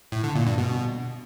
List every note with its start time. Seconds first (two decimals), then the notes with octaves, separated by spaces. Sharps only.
0.12 A2
0.24 D3
0.35 A#2
0.47 G2
0.58 B2